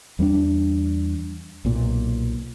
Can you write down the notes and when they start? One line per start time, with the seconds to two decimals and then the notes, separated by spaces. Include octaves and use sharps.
0.19 E2 G3 C4 D4
1.65 B1 A#2